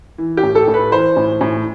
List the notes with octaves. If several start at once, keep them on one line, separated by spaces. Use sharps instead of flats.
E3
G4
A2
A4
A2
B4
E3 C5
A2
A2